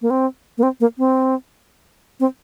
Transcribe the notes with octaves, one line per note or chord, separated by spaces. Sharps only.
A#3
C4
A#3
C4
A#3
C4
C4